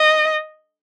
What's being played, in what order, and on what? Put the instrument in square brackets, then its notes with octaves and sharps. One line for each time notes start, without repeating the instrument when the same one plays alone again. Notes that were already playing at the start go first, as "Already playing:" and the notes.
Already playing: [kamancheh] D#5